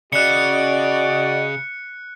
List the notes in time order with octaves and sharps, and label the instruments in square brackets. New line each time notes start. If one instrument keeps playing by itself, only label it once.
[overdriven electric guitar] C#3 [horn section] F#4 D#5 [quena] D5 [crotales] F#6 C#7